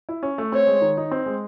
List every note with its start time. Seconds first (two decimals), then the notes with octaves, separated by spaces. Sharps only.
0.09 E4
0.23 C#4
0.38 A3
0.52 C4 C#5
0.67 G#3
0.82 D#3
0.97 D#4
1.11 C4
1.26 G#3